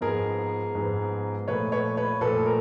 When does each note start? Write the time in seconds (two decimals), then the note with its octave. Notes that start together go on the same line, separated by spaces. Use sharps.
0.01 G#2 F3 G#3 B3 G#4 A#4
0.75 G#2 F3 G#3 B3
1.48 A#2 F3 A3 B4 C#5
1.72 B4 C#5
1.97 B4 C#5
2.21 A#2 F3 A3 A4 B4
2.46 A#4